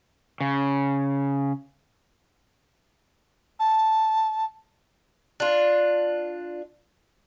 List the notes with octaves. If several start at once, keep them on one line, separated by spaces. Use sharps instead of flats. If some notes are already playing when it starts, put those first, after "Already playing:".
C#3
A5
D4 F4